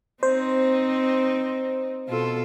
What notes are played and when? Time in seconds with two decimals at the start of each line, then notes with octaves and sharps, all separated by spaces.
0.23 C4 D#4 C5
2.08 B2 F4 A4